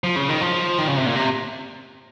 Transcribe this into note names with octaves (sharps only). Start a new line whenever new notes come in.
F3
C#3
D#3
F3
D#3
C#3
C3
A#2
C3